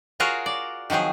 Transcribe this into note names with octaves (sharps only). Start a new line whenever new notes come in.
F4 F#4 G#4 A#4 C#5
D5
D#3 F3 F#3 C4 G#4